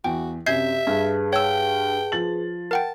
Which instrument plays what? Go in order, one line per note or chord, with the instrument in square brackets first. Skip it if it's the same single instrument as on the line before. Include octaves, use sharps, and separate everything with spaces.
[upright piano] E2 [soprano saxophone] F#4 [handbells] G5
[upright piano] F#2 C3 [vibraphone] G4 [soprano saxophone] E5 [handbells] G6 G#6 C7
[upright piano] G2 [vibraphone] G#4 B4 A5
[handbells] C#5 E6 [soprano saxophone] G5
[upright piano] F3 A6 F#7
[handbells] A#4 F#5 G5 [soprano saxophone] A5